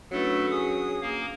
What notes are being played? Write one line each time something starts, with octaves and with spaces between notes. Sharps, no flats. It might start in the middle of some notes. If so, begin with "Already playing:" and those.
F#3 A3 C#4 D4 E4 A4 B4
G#4 D#6
A#3 F5